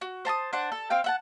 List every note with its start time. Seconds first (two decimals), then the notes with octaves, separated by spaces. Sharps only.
0.01 F#4
0.25 C5 A5 A#5 D#6
0.53 D4 C5 F#5
0.72 A4
0.90 C4 F5 G5
1.04 E5 F#5 A5